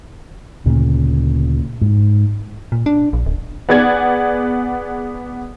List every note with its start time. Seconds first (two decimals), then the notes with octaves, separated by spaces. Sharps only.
0.66 D2 A#2 C#3
1.81 G#2
2.72 A#2
2.86 D4
3.13 A#1
3.26 D1
3.69 B3 G#4 D5 F#5 G#6